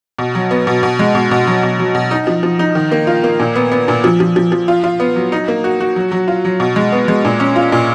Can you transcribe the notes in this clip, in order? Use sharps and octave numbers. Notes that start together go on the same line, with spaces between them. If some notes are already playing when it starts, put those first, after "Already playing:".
B2
F#3
B3
B2
B2
G#3
B2
B2
F#3
B2
F#3
B2
D#4
F3
F3
D#4
D#3
A#3
F4
A#3
A#2
B3
B3
A#2
F3
F3
F3
F3
F4
F4
B3
F#3
D#4
A#3
F#4
F#4
F#3
F#3
F4
F#3
B2
G#3
B3
G#3
A#2
C#4
F4
A#2